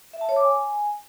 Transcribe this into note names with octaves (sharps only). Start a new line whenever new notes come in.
E5
A5
C#5
D6
G#5